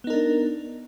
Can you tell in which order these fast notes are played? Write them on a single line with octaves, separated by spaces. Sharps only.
B3 D#4 A#4 D4